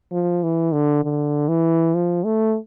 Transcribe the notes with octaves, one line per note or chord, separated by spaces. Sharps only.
F3
E3
D3
D3
E3
F3
A3